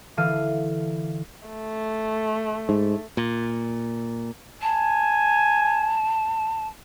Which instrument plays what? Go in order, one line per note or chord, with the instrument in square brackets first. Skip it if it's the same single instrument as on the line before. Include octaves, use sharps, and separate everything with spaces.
[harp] D3 E3 A4 F5 F6 D#7
[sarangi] A3
[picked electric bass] G#2
[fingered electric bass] A#2
[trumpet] G#5 [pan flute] A5